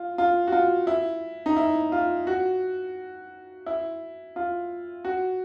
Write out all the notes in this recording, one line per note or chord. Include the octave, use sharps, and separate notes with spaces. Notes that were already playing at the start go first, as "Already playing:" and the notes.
Already playing: F4
F4
F#4
F4
E4
D#4
E4
F4
F#4
E4
F4
F#4